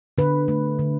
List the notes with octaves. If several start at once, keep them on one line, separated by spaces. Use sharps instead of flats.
D3 B4
A3
D3